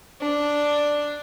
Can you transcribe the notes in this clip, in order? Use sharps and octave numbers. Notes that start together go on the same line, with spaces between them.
D4